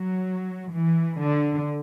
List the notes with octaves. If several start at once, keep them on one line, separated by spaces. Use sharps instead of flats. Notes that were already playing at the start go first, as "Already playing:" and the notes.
Already playing: F#3
E3
D3